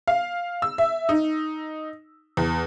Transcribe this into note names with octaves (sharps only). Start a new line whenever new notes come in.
F5
E6
E5
D#4
E2